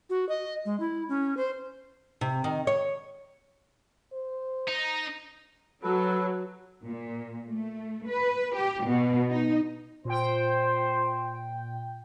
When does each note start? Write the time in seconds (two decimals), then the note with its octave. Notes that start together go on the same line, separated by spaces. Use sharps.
0.10 F#4
0.29 D#5
0.65 G#3
0.80 E4
1.09 C#4
1.37 C5
2.21 C3
2.44 D#3
2.67 C#5
4.13 C5
4.68 D#4
5.83 F#3 A4 B4
6.84 A#2
7.47 A3
8.07 B4
8.55 G4
8.86 B2
9.31 D#4
10.05 A#2 F4 C5 G5